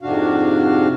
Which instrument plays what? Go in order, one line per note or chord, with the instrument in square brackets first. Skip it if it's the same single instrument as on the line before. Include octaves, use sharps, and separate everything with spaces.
[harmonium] F2 G#2 C3 D4 F#4 F5